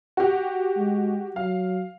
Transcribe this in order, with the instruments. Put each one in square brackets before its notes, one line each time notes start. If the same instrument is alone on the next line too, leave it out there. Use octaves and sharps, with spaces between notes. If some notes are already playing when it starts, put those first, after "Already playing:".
[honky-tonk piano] F#4 G4
[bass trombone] G#3
[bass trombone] F#3 [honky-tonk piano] F5